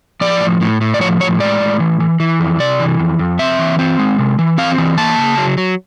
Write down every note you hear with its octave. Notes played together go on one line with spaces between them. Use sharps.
F3 D5
A2
A2
A2
D5
F3 C#5
A2 C#5
G#3 D5
A2
E3
E3
E3
F2
C3 D5
E3
F2
F2
C4 E5
E3
C4
G#3
C3
E3
C4 F5
E3
A#3 A5
C#3
F#3
F#3